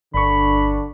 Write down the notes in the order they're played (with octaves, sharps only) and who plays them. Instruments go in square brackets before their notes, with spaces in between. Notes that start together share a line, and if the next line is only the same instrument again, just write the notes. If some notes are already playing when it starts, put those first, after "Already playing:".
[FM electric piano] G1 C#6 [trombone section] D3 D4 [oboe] B5